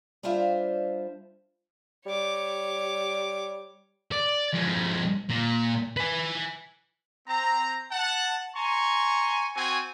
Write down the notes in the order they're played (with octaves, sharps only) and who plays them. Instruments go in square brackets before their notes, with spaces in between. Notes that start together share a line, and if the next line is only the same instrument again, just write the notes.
[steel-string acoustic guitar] G3 D4 F4 C5 E5 F5
[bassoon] G3 [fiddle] C#5 D6
[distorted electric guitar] D5
F2 G#3
A#2
B4 G#5
[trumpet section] C4 A#5
F#5 A5
G#5 A#5 C6 C#6
C4 F#4 G#5